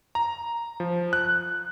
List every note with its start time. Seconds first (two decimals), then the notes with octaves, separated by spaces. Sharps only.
0.15 A#5
0.80 F3
1.13 F#6